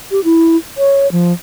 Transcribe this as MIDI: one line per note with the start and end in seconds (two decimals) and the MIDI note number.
0.11 0.23 67
0.24 0.57 64
0.77 1.10 73
1.12 1.33 53